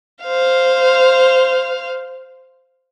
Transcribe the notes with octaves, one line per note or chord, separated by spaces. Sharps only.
C5 F5